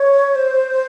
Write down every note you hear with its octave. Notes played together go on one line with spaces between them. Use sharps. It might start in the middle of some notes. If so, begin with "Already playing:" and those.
Already playing: C#5
C5